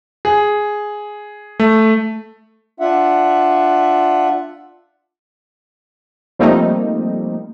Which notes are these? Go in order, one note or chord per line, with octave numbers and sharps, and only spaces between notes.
G#4
A3
D4 F4 E5 F#5
F3 G3 A3 A#3 C4 D#4